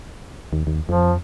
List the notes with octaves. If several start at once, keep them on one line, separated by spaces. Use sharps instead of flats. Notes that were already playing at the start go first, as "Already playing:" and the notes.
D#2
D#2
F2 F3